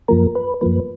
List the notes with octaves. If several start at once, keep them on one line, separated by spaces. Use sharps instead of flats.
F#2 F3 A#3 A#4
B4
F#2 F3 A#3 B4